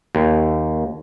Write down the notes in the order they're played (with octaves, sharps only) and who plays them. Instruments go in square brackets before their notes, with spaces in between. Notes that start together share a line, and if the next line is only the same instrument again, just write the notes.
[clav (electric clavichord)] D#2